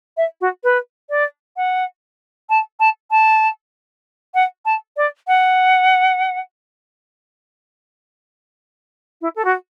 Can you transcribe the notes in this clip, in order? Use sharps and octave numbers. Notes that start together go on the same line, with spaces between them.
E5
F#4
B4
D5
F#5
A5
A5
A5
F#5
A5
D5
F#5
E4
A4
F#4